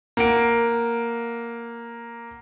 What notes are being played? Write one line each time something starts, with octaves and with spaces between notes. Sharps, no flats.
A#3 F#5 D7